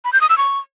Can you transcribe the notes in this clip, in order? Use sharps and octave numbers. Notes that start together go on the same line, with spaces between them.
B5
G6
D#6
E6
C#6